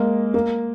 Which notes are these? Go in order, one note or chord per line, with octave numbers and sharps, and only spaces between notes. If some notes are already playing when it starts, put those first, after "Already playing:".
Already playing: G#3 A#3
A#3